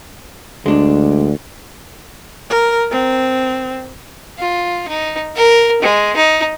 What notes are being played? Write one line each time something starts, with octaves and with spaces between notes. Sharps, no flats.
D2 G#3 D4
A#4
C4
F4
D#4
A#4
G#3
D#4